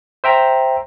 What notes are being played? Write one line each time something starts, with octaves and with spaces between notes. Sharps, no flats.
C5 E5 G5 A#5